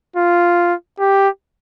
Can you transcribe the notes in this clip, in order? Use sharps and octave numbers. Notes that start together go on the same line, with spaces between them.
F4
G4